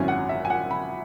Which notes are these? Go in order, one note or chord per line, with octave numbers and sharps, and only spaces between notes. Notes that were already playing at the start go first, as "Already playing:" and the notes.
Already playing: G#1 F#2 F#3 C#4 E4 G#5
F#5
E5
G#5
F#5
B5